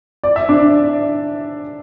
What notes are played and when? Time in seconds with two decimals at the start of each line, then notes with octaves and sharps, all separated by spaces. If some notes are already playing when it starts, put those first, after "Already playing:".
0.24 D5
0.36 E5
0.49 D4 D5